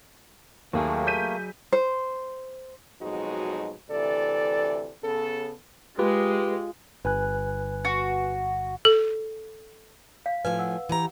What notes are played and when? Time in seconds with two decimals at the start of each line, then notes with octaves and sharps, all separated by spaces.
0.73 D#2 F#3 A3 A#3 G#4 G#5
1.07 G6 B6 D#7
1.73 C5
3.01 F2 B2 F#3 G#3 D#4 F#4
3.90 D2 C3 E3 A4 D5
5.04 C#3 B3 A4
5.99 G#3 F4 G4 B4
7.05 G1 B4 G#5 F#6
7.85 F#4
8.85 A4
10.26 F5
10.45 A2 F3 B4 F5 G#5
10.59 F#5 E6
10.89 E3 G4 A#5